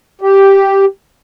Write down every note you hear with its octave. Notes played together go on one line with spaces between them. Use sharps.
G4